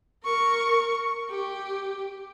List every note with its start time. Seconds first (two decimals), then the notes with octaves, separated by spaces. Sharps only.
0.24 A#4 C#6
1.30 G4